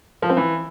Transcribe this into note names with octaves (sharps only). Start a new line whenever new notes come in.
F3
C4
E3